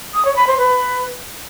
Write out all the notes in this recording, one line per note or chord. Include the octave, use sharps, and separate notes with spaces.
D#6
C#5
B5
C5
B4